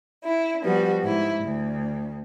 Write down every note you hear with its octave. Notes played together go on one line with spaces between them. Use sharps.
E4
F3 G3 B3 F#4
G#2 E4
D2